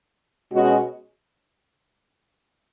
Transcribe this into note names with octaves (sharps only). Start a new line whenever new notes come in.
B2 G#3 C#4 F#4